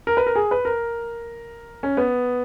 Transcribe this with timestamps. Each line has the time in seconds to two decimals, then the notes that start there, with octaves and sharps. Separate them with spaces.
0.07 A#4
0.17 B4
0.27 A#4
0.35 G#4
0.51 B4
0.65 A#4
1.83 C#4
1.97 B3